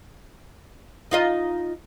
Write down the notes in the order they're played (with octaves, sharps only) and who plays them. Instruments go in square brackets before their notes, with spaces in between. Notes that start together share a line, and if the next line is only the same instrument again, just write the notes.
[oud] D#4 F4 D#5